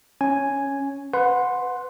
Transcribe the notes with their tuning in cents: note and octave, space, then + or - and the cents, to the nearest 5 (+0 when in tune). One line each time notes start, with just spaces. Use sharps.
C#4 +0 G#5 +0
B4 +20 F#5 -20 C6 +5